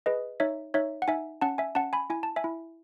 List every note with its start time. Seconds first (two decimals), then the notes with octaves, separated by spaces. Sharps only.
0.06 G#4 B4 D#5
0.40 D#4 C#5 E5
0.74 D#4 C#5 E5
1.02 F#5
1.08 D#4 E5 G#5
1.41 C#4 F#5 A5
1.58 E5 G#5
1.75 C#4 F#5 A5
1.93 G#5 B5
2.10 E4 G#5
2.23 A5
2.36 E5 G#5
2.44 E4